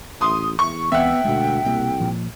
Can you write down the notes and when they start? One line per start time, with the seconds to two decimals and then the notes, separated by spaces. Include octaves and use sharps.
0.21 A1 C6 D#6
0.59 E2 C#6
0.92 C#2 E3 B3 C4 E5 F#5 G5
1.24 D2 B2 G#3
1.64 C2 B2 A3 A#3
2.00 A#2 F3